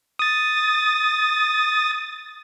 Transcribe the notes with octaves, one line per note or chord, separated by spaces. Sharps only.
D#6 A6